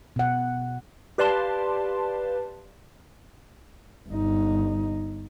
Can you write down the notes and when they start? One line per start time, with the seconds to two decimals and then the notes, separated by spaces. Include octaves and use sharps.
0.16 B2 F#5
1.18 G4 B4 D5 F5 A5 C6
4.09 G1 D#4